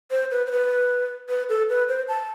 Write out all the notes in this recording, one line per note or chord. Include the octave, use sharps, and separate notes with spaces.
C5
B4
C5
B4
B4
A4
B4
C5
A5